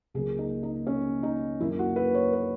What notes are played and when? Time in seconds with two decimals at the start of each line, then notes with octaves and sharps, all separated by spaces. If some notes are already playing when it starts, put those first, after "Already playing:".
0.14 C#2 C#3 F#3 A#3 G#4
0.39 D#4
0.63 D#4
0.87 C#4
1.23 D#4
1.60 F#2 D#3 A#3 E4
1.79 F#4
1.96 B4
2.15 C#5
2.33 B4